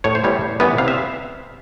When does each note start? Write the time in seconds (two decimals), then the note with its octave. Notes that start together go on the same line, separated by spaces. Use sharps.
0.04 A2 C#5
0.15 C5
0.24 E3 G3 B3 E4 C#5
0.41 A2
0.60 E3 G3 B3 E4
0.78 C3 F5
0.88 E5